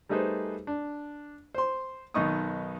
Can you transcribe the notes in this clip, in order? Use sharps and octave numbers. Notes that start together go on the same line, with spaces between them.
G3 A3 D#4 G#4 B4 C5
D4
C5 C6
B1 D#3 B3 D#4 C#6 D#6